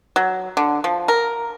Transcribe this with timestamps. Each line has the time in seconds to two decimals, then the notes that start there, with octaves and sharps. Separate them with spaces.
0.16 F#3
0.57 D3
0.84 F3
1.08 A#4